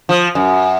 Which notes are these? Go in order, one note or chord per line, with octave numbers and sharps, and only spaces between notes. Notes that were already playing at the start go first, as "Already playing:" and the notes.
F3
F#2